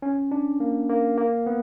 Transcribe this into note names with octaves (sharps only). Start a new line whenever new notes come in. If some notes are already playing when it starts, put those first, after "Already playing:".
C#4
D4
A#3
A#3
A#3
B3